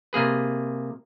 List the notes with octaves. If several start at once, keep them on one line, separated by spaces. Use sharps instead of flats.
C3 A#3 G#4 B4